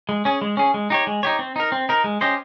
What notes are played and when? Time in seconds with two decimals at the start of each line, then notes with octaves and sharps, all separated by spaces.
0.09 G#3
0.25 C#4 G#4
0.41 G#3
0.57 C#4 G#4
0.74 G#3
0.90 D#4 G4 C#5
1.07 G#3
1.23 D#4 G4 C#5
1.39 C4
1.56 D#4 A#4
1.72 C4
1.89 D#4 A#4
2.04 G#3
2.21 C#4 G4 C5 D#5